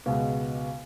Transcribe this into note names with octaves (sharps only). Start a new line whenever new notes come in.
C#2 B2 G#3